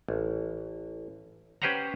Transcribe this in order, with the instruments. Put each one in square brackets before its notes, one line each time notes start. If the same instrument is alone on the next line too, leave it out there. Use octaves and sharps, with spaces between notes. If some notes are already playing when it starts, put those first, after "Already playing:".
[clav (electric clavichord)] A1
C#4 G4 B4 C5 F#5 A#5